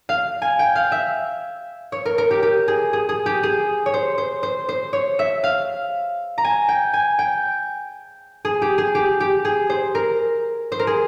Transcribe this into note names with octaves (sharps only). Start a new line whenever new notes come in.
F5
G#5
G5
F5
E5
C#5
A#4
A#4
G4
G4
G#4
G#4
G#4
G4
G#4
C#5
C5
C5
C5
C5
C#5
E5
F5
A#5
G#5
G5
G#5
G5
G#4
G4
G#4
G4
G4
G#4
C5
A#4
C5
A#4
G#4